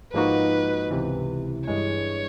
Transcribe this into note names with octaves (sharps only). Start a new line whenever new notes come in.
G#2 F3 A#3 D#4 F#4 B4
C#2 C3 E3
G2 E3 G#3 C#5